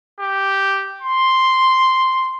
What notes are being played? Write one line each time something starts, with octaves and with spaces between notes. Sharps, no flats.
G4
C6